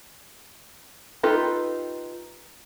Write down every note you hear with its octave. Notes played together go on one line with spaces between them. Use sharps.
D#4 F4 G4 A4 B4